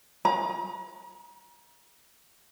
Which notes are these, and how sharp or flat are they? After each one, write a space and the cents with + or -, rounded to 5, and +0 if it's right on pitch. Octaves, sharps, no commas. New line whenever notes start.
A#5 +40